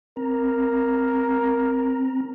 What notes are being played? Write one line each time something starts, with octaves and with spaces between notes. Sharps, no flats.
C4 A#4 A#5